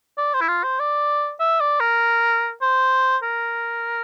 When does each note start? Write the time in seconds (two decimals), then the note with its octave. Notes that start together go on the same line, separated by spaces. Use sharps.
0.18 D5
0.34 C5
0.41 E4
0.48 F4
0.64 C5
0.79 D5
1.40 E5
1.61 D5
1.80 A#4
2.62 C5
3.23 A#4